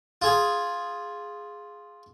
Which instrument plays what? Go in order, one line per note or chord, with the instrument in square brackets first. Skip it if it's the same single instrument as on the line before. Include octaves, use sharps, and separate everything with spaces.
[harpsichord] F4 G#4 G#5